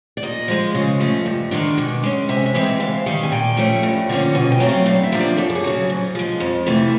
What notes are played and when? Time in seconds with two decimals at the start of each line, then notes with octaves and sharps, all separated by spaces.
0.17 D5
0.23 A#2 D#5
0.48 F3 G#3
0.74 C#3
1.00 F3 A3
1.26 G2
1.51 D#3 G#3 B3 D4
1.78 B2
2.04 G#3 C#4
2.29 C3 E5
2.46 E5
2.54 E3 G#3 C4
2.63 E5
2.80 G#2 F5
3.06 D#3 G3
3.23 G#5
3.32 A#2 G5
3.57 F3 A3 C#4
3.83 G2
4.09 D3 F3 A#3 C#4
4.34 B2 G#5
4.52 G5
4.60 F#3 A3 C4
4.69 F5
4.86 G2 F5
5.03 E5
5.12 D3 F3 A#3 D4
5.20 D5
5.37 F#2 A4
5.50 A4
5.55 G#4
5.64 C#3 F#3
5.90 G#2
6.15 F3 G#3
6.40 F2
6.66 C3 E3 A3